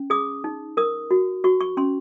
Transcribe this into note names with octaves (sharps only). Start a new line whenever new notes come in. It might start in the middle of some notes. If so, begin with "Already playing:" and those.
Already playing: C#4
G#4 D#6
D#4
A#4 D#6
F#4
F#4 C#6
C#6
C#4 C6